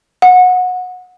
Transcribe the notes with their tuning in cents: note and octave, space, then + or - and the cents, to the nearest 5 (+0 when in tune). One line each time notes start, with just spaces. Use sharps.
F#5 -20